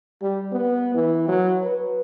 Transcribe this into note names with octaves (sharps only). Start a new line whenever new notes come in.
G3
B3
E3
F#3
B4